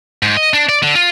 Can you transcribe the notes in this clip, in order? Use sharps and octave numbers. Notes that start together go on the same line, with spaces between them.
G#2
D#5
D4
D5
D3
F4